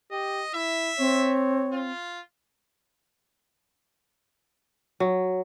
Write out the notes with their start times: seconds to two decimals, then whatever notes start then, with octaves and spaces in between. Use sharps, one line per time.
0.11 G4 D#5
0.54 E4 E5
0.99 C4 C#5
1.73 F4
5.00 F#3